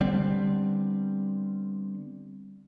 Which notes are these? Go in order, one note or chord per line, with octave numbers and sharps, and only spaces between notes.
D3 G3 B3 C4